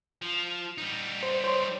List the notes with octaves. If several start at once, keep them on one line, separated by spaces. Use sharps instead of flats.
F3
G3 D#4
C5
C5 C#5 C6